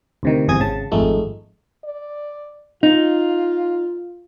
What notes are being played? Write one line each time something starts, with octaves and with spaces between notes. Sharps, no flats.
D2 C3 D#3
G1 E2 C3 G#4 D#6 G#6
G#1 C#3 A5
G#1 F2 G#3 A3 D#4
D5
D#4 F4